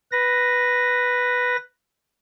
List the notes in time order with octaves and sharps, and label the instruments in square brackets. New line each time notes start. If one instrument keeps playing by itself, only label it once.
[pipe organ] B4 A#6